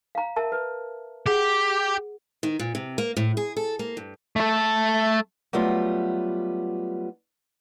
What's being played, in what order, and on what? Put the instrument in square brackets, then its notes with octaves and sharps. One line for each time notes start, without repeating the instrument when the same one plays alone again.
[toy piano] F5 A#5
A#4 E5 A5
B4
[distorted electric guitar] G4 [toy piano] G#4 F#5
[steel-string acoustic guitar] D#3
A#2
C3
A#3
A2
G#4
A4
A#3
G2
[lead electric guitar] A3 A4
[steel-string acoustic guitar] F#3 G3 A3 B3 F4